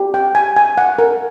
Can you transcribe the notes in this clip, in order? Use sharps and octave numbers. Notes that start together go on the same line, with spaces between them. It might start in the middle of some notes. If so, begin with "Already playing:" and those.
Already playing: G4
G5
G#5
G#5
F#5
A#4